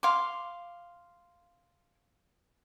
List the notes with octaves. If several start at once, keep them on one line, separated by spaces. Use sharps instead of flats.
F5 C6 D6